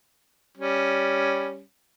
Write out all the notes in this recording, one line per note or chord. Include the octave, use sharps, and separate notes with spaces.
G3 C#4